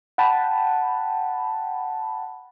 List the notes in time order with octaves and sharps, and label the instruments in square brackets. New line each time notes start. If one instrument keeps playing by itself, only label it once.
[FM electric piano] F#5 G5 A5 B5